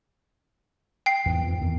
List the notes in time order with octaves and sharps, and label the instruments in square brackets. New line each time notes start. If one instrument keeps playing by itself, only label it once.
[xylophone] G5 C7
[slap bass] E2 G#2 E3
F2 G#2
E2 D#3